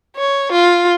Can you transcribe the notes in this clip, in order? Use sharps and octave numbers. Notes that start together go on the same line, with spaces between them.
C#5
F4